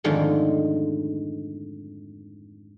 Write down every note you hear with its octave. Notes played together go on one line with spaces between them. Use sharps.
F2 G#2 D3 D#3 G#3 A3